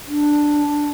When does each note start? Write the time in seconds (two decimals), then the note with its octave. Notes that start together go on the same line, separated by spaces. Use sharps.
0.08 D4